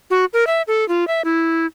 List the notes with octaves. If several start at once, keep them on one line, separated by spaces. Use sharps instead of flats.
F#4
A#4
E5
A4
F4
E5
E4